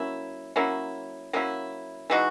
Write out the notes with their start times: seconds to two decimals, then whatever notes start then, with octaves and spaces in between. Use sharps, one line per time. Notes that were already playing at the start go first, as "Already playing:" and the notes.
Already playing: F#3 A#3 C#4 E4
0.56 F#3 A#3 C#4 E4
1.33 F#3 A#3 C#4 E4
2.10 E3 G#3 D#4 F#4